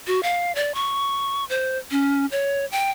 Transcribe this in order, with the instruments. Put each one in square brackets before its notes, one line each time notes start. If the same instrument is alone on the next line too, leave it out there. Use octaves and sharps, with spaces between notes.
[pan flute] F#4
F5
D5
C#6
C5
C#4
C#5
G5